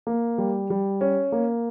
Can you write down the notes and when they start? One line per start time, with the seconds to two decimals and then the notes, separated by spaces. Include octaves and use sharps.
0.07 A#3
0.38 G3
0.70 G3
1.01 C#4
1.32 A#3